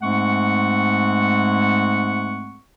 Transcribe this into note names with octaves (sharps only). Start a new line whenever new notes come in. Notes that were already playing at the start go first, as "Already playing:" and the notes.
G#2 G#3 A3 C4 F#5 C#6